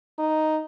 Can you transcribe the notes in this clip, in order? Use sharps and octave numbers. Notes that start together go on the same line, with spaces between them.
D#4